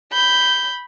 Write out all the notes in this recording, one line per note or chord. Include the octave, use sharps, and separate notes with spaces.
B5 G6